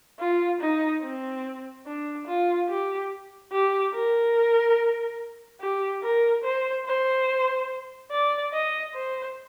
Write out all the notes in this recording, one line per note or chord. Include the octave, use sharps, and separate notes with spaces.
F4
D#4
C4
D4
F4
G4
G4
A#4
G4
A#4
C5
C5
D5
D#5
C5